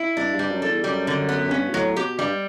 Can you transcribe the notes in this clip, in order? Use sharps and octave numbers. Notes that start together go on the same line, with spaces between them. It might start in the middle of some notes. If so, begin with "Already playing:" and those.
Already playing: E4
G2 D4
G2
G3
F#2
A4
E2
F#2 G3
D3
B3
F#2
G2 C#4
B2
A2 F#3
B2 G4
G2 G3